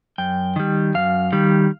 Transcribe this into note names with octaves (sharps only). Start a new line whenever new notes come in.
F#2 G5
D#3 G3
F#2 F5
D#3 G3